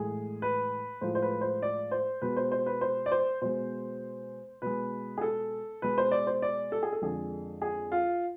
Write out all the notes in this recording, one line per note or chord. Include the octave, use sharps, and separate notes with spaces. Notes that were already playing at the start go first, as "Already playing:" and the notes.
Already playing: A2 E3 G#3 G#4
B4
A2 F3 G#3 C5
C5
B4
C5
D5
C5
B2 G#3 B4
C5
C5
B4
C5
D5
C5
B2 G#3 C5
B2 G#3 B4
G#4
A4
B2 G#3 B4
C5
D5
C5
D5
A4
G#4
A4
F2 D3 G#3 G#4
G#4
F4